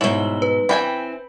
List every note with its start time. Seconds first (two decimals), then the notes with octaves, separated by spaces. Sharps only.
0.01 G#2 B2 E4 C#5 F#7 G7
0.42 B4
0.69 E3 C4 G5 G#5 B5